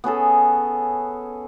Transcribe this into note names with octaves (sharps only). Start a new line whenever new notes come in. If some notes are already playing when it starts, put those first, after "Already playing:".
B3 C#4 G#4 A4